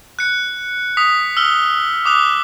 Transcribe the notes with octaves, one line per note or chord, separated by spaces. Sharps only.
F#6 C#7
D#6 B6
E6 F6 G7
D6 D#6 F#6